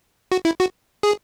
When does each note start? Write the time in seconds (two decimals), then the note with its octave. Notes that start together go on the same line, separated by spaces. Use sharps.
0.32 F#4
0.45 E4
0.60 F#4
1.03 G#4